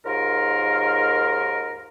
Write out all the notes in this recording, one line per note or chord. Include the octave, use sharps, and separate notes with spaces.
D#2 G#2 F4 A#4